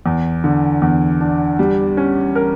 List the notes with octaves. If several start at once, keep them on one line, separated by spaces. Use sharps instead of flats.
E2
D3
E2
D4
G3
C#4
A#4